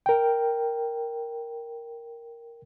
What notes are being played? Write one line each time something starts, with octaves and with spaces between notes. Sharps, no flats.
A#4 G5